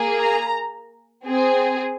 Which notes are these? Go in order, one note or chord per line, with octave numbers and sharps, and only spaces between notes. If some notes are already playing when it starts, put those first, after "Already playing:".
Already playing: A#3 G#4
A#5
C4 G#4